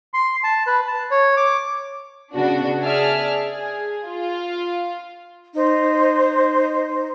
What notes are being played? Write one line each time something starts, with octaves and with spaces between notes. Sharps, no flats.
C6
A5
B4
A5
C#5
D6
C#3 B3 D4 F#4
G#4 D5 E5 A5 F6
G#4
F4 F5
D#4 C5